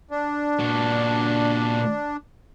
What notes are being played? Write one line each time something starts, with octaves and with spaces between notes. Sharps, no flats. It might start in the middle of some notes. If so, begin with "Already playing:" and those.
D4
A#2 F#4